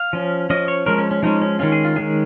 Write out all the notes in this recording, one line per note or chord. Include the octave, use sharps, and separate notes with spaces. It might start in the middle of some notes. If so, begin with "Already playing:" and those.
Already playing: F5
F3 C#4
F3 C#4 D#5
C#5
F3 G#3 C#4 A#4
C#4
C#4
F3 G#3 C#4 D#4
C#4
D#3 G#3 C#4 F4
G#4
F4
D#3 G#3 C#4 G#4